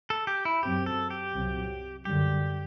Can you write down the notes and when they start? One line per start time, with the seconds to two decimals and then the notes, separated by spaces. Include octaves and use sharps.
0.10 A4
0.27 G4
0.45 E4
0.63 F#2 F#3 C4 G4
0.86 A4
1.10 G4
1.34 C2 C3 F#3
2.05 F#2 D3 G3 G4